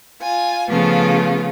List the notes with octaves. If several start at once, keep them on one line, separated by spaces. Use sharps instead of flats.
F4 G#5
C#3 F3 A3 B3 F4